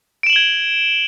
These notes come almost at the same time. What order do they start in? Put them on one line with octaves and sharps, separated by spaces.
D7 E7 F#7 G7 G#6